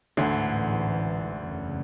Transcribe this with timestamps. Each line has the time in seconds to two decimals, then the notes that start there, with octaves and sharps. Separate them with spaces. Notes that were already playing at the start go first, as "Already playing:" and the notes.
0.17 A1 D2 G#2 D3 E3
1.46 F#1 E2 C#3